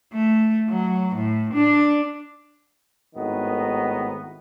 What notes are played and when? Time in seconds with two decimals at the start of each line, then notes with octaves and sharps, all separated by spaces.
0.14 A3
0.69 F#3
1.16 A2
1.54 D4
3.14 G#1 A2 D#3 B3 D#5